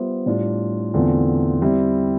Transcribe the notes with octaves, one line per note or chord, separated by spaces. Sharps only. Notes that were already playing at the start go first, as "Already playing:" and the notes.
Already playing: G3 B3 F4 C5 E5
A2 G3 D4 F4
E2 D3 A3 C4 F4
G3 C4 E4